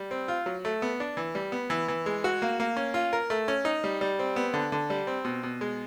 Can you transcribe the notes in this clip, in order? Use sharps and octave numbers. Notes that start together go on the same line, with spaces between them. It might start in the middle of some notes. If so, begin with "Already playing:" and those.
Already playing: G3
C4
F4
F#3
A3
B3
D4
E3
G3
B3
E3
E3
G#3
F#4
A#3
A#3
C#4
F4
A#4
A3
C#4
D#4
G3
G3
C4
B3
D3
D3
G3
C4
B2
B2
G#3